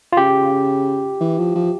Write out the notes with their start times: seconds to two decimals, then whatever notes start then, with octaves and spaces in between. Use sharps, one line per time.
0.13 F4
0.17 C#3 G4
1.21 E3
1.38 F3
1.55 F3